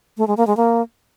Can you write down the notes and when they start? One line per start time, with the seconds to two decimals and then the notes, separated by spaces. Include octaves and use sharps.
0.18 A3
0.27 G#3
0.37 A#3
0.47 G#3
0.57 A#3